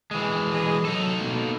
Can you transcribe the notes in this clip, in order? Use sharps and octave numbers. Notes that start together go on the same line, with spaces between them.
E3 G#3
G#4 D#5
F#3 D#4 A4
B2 A3 A#3